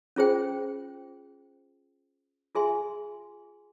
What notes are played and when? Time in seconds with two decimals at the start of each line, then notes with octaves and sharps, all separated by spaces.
0.16 C#4 F4 G#4 C5 G5
2.55 F4 G#4 E5 G#5 C6